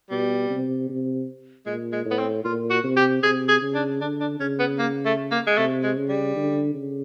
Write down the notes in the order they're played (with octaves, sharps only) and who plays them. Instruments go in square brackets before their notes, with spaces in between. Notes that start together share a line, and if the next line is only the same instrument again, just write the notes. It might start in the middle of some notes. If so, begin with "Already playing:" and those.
[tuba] B2 [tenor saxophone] G3
[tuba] C3
C3
[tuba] A#2 [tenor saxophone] G#3
[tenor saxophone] G#3
[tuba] A2
[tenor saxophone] B3
C4
[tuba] A#2 [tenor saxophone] F4
[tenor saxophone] F#4
[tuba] C3
[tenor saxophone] G4
[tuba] C3 [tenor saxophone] G#4
[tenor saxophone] G#4
[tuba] C#3
[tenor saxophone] D4
[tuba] D3 [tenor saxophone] D4
[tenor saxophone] D4
[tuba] C#3 [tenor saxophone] C#4
[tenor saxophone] B3
A#3
A3
A#3
G#3
[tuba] C3 [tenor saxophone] A3
[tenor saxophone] G#3
[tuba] C#3
[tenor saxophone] G3
[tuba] D3
C#3